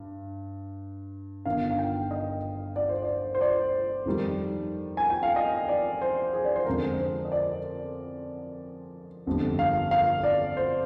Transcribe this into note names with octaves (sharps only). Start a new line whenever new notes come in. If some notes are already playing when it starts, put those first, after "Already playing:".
Already playing: G2
G1 G2 D#3 F5
F5
G5
D#5
D5
C5
D5
C5
D5
F2 D#3 G3
G#5
G5
F5
D#5
D5
C5
G#4
D5
C5
F2 D3 G#3 A#4
C5
D#5
D5
G1 F2 D3 G3
F5
F5
D5
C5